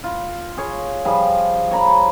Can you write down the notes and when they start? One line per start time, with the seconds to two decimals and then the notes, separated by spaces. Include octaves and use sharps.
0.04 F4
0.57 G#4 C#5
1.05 F3 G3 G#4
1.71 C#5 A#5 B5